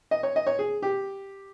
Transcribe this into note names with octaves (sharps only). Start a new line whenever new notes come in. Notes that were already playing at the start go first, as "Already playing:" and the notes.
D#5
C#5
D#5
C#5
G#4
G4